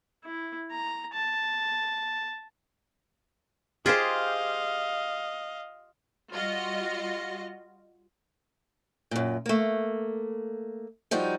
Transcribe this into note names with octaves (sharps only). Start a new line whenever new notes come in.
E4
A#5
A5
F4 G4 G#4 C5 D#5 F5
G3 F4 F#4 D#5
F#2 A#2
A3 A#3
F3 G3 D#4 F#4